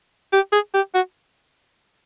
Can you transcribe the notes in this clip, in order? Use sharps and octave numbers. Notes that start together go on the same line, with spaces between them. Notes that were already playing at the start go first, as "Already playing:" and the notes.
G4
G#4
G4
F#4